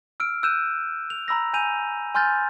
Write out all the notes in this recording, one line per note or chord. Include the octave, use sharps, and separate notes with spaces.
E6 F6 D7
E6 F#6 G6 D#7 E7
F7
A#5 B5 E6 A#6
G#5 G6 D#7 F7
G#5 C6 F6 G6 A6